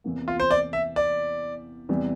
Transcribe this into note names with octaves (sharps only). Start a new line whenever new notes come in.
E2 C3 E3 A#3
F4
C5
D5
E5
D5
E2 C3 E3 G3